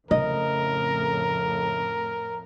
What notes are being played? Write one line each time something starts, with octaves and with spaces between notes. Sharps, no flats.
F2 A2 C#3 A#4 D#5